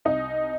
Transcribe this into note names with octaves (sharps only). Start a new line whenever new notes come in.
C2 D#4 D#5